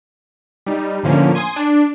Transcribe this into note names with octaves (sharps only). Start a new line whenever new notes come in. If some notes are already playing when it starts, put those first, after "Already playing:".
G3 D#4
A2 D3 F3 A#3 C#4
G#5 C6 D#6
D4